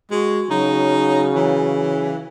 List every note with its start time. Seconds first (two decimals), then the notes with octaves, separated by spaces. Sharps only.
0.11 G#3 F#4
0.51 C#3 F#3 D#4
1.35 E3